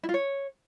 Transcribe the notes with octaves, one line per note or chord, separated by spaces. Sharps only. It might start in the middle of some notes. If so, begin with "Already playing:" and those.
E4
F4
C#5